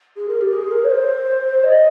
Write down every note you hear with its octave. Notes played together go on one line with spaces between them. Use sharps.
G#4
A#4
G4
G#4
A#4
C#5
C5
D#5